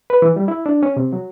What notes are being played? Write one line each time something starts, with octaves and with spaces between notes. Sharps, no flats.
B4
E3
G3
E4
D4
C#4
C3
F#3